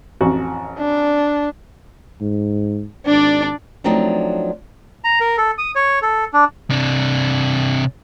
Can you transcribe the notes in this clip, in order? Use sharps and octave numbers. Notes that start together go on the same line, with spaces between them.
A1 F2 F#4
D4
G#2
G#1 D4 D5
F3 F#3 A3 C4 D4 D#4
A#5
A#4
A4
D#6
C#5
A4
D4
C3 D4